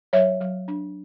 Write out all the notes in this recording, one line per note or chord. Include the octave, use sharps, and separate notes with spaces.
F#3 C#5 E5
F#3
D4